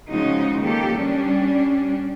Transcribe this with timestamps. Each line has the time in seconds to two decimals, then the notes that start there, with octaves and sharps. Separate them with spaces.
0.10 C#3 F3 G#3 D#4 F#4
0.62 D#3 A#3 G4 A4
0.97 G3 C#4 D4